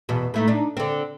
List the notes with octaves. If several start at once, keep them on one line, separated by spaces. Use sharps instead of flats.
E2 B2
A2 A3 D#4
D4 D#4
D3 C4